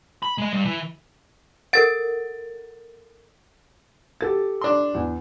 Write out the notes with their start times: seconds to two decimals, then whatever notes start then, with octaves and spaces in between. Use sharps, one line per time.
0.23 B5
0.38 G#3 D#5
0.53 G2
0.65 E3
1.73 A4 A#4 F#5 A6 D7
4.21 G4 A4 A6
4.61 D4 C6
4.95 E2